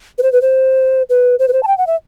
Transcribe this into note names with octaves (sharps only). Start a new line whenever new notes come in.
B4
C5
B4
C5
B4
C5
B4
C5
A5
G5
F#5
E5